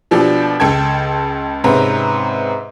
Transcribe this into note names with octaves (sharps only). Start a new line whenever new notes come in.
B2 F3 D4 G4 A4
C#2 A4 G5 A5 G#6
G#2 C3 C4 C#4 B4 A#5